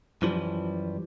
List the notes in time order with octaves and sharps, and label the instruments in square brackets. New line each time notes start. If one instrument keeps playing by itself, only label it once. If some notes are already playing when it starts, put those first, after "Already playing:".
[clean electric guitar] F#2 E3 F3 G3